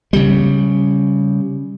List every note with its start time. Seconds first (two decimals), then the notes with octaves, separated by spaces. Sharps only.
0.13 C#3 G3